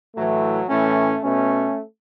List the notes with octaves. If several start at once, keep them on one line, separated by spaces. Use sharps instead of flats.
A2 E3 F#3 A3
A2 E3 A3 C#4
B2 A3 C#4